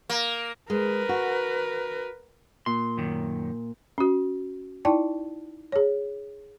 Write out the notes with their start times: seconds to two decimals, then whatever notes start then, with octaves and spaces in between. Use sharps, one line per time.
0.10 A#3
0.70 G#3 A#4 B4
1.09 F#4
2.66 A#2 C6
2.97 F#2 D#3
3.98 C#4 F#4
4.85 D#4 E4 D5 G5 A5
5.72 G#4 C#5